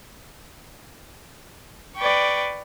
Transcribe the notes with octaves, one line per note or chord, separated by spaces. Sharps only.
B4 D5 G5 C#6